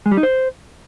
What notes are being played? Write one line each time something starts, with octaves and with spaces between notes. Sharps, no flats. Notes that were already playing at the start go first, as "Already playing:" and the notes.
G#3
G3
D#4
C5